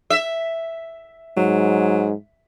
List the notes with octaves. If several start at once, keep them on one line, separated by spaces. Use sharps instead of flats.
E5
G#2 F#3